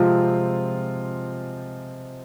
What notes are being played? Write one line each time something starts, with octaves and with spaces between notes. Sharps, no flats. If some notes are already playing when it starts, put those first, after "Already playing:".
Already playing: C3 F3 G#3 C4 F4